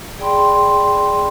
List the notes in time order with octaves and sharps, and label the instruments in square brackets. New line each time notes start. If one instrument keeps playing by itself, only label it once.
[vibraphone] G#4 D5 G5 B5 C6